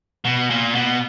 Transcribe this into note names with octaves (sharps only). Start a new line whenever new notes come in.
B2
A#2
B2